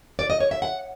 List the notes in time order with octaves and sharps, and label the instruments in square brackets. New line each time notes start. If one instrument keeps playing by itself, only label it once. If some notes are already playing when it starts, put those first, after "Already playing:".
[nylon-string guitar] D5
D#5
C#5
E5
F#5